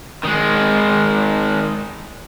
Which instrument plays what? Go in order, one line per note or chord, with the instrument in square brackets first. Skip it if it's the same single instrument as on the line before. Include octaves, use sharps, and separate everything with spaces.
[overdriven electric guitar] D#3 G#3